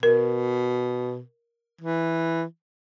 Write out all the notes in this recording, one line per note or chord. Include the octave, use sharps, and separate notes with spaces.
B2 A#4
E3